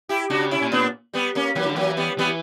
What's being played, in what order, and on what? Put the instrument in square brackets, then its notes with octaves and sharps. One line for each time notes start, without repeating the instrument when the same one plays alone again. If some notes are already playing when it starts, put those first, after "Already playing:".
[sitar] E4 G4
[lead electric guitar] C#3 [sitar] D4 F#4
[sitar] C#4 E4
[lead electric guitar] A#2
[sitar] B3 D4
G3 B3
A#3 C#4
[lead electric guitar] E3 [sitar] F#3 A#3
[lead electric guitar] D3 [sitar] G3
[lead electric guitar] E3 [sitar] F#3 A#3
[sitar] G3 B3
[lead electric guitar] E3 [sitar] G3 B3